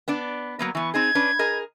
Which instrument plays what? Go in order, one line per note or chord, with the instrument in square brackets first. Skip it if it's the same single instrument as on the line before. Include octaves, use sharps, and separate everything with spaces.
[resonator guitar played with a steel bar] B3 D4 D5
F#3 A#3 B3
[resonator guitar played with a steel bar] E3 B3 [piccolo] C#6
[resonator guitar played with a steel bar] C4 D#4 G#4 [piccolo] G#6
[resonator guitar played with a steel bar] C#4 D4 B4
G#4 A#4 D#5